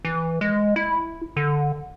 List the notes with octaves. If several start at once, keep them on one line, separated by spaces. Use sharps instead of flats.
E3
G#3
E4
D3